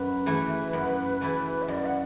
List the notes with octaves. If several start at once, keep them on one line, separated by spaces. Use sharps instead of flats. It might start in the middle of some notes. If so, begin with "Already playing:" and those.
Already playing: F#2 B4
E3 A3 E4
F#2
E3 A3 E4
E5
F#2 D5
F#5